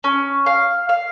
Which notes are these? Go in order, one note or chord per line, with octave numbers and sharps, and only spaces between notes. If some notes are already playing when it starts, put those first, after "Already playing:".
C#4
F5
F5